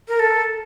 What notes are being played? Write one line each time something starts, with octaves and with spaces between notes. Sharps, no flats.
A#4
A4